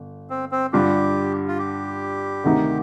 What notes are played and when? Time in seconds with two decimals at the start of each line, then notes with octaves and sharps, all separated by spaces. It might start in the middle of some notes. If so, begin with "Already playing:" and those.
Already playing: G1
0.30 C4
0.52 C4
0.73 G2 D3 G3 D4 F4 G4
1.48 F4
1.58 G4
2.44 D2 C3 D#3 A3 D#4